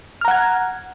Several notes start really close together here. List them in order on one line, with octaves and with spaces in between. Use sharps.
F6 A#5 F#5 G#6